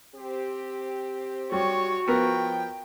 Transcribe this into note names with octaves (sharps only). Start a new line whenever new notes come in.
C4 G4
G3 F#4 C#5
F3 B3 A#4 G5